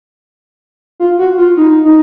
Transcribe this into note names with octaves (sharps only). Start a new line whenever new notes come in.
F4
F#4
F4
D#4
D#4